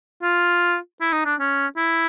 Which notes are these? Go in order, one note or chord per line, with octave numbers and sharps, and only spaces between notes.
F4
E4
D#4
D4
C#4
E4